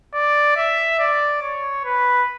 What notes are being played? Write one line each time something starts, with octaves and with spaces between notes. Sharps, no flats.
D5
E5
D5
C#5
B4